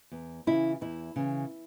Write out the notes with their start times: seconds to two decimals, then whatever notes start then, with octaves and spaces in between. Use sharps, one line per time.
0.11 E2
0.47 C#3 E3 E4
0.81 E2 E4
1.16 C#3 E3